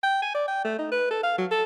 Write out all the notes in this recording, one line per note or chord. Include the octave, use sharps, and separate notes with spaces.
G5
G#5
D5
G5
A3
D#4
B4
A4
F5
F#3
A4